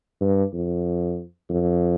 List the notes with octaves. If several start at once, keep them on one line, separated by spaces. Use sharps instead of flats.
G2
F2
F2